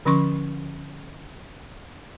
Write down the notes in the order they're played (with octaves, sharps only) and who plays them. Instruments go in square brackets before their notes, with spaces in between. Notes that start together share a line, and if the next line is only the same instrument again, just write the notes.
[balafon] D3 F3 C#4 C6 C#6